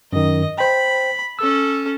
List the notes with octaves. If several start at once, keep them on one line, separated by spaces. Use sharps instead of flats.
F#2 D#3 D#5
C5 G5 B5
C#4 A4 E6